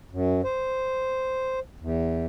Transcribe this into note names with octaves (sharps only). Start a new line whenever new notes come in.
F#2
C5
E2